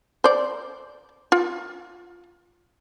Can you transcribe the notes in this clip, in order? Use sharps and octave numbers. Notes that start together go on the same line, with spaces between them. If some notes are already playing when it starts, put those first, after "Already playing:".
C5 D5
F4